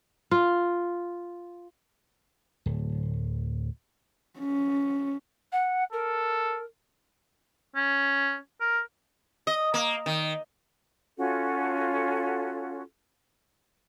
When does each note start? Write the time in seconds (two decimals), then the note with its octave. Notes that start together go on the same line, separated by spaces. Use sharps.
0.31 F4
2.66 D1
4.39 C#4
5.52 F#5
5.92 A4 A#4
7.75 C#4
8.60 A#4
9.47 D#5
9.74 A#3
10.06 D#3
11.17 C#4 F4 F#4 A4